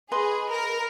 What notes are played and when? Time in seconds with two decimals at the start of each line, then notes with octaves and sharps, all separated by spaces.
0.12 G#4 B4 D#5 C6
0.50 A#4